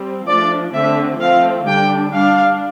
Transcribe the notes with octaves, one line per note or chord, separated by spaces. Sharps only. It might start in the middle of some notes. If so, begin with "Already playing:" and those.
Already playing: G3 C4
F3 A3 D4 D5
D3 A3 C4 E5
F3 A3 C4 F5
D3 G3 D4 G5
G3 D4 F5